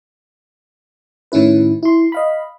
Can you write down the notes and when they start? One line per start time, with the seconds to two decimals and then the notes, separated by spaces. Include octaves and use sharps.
1.32 A2 D#3 C#4 E4 B4
1.83 E4 C6
2.12 D#5 F5 B5